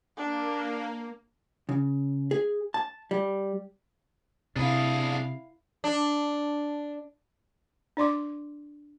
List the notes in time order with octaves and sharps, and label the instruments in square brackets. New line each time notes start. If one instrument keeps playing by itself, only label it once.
[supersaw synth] A#3 [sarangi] D4
[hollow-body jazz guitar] C#3
G#4
A5
G3
[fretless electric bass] C3 [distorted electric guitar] D4 G#4 [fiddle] E4 F5
[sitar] D4
[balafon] D4 D5 C6 D6